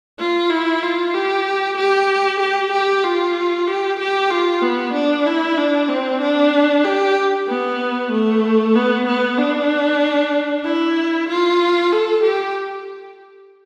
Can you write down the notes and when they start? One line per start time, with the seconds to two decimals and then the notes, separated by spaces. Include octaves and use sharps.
0.19 F4
0.50 E4
0.83 F4
1.14 G4
1.77 G4
2.40 G4
2.72 G4
3.05 F4
3.68 G4
4.00 G4
4.30 F4
4.63 B3
4.94 D4
5.26 E4
5.58 D4
5.89 C4
6.21 D4
6.84 G4
7.48 B3
8.12 A3
8.75 B3
9.07 B3
9.38 D4
10.65 E4
11.29 F4
11.92 A4
12.23 G4